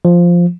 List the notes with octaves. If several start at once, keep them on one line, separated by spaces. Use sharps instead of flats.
F3